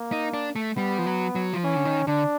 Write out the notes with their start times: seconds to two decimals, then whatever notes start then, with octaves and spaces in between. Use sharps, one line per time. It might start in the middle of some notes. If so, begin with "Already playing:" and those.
Already playing: A#3
0.12 D#4
0.33 D4
0.56 A3
0.77 G3 B3
0.98 F3
1.06 F#3
1.35 F#3
1.53 F3
1.64 E3 C#4
1.76 D3
1.85 D#3
2.07 D3 D4